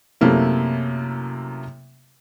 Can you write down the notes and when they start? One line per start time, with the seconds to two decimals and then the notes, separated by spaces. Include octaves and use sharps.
0.21 F#2 C3 A3 A#3 E4